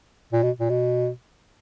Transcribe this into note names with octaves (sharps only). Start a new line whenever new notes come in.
A#2
B2
A#2
B2